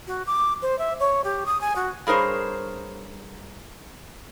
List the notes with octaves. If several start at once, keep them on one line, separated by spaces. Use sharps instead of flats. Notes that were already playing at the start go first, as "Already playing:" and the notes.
F#4
D6
C5
E5
C#5
G4
D#6
G#5
F#4
G2 G#4 A#4 C5 C#5